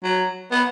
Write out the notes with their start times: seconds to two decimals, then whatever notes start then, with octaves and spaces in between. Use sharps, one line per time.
0.04 F#3
0.52 B3